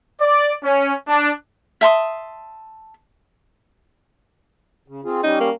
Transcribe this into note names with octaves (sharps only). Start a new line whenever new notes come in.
D5
C#4
D4
E5 A5 C6 D#6
C#3
C4 F4 G#4
G3 C#4 D#4
A#3